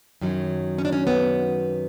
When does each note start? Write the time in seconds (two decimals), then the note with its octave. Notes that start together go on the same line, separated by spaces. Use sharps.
0.21 F#2 D#3 F#3
0.78 C#4
0.85 D4
0.93 C#4
1.07 B3